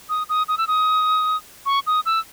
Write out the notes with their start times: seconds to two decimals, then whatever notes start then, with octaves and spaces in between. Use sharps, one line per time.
0.09 D#6
0.29 D#6
0.48 D#6
0.58 E6
0.68 D#6
1.66 C#6
1.87 D#6
2.06 E6